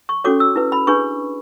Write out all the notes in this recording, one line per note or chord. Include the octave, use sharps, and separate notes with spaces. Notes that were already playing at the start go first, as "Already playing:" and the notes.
C#6
C#4 F#4 A4 C#5 D6
E6
E4 B4
B5
D4 G#4 B4 C#6